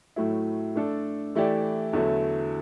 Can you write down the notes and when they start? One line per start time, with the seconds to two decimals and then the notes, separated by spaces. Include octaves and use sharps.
0.16 A2 F#3 A3 E4
0.76 A3 D4 A4
1.35 E3 A3 E4 G4 D5
1.93 E2 D3 F#3 A3 E4